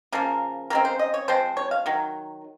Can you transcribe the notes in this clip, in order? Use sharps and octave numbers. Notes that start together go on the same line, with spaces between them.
C#3 F3 A#3 A#4
C#3 G#3 C4 A#4
C5
D#5
C#5
F3 G#3 C4 C5
C#5
F5
D#3 F#3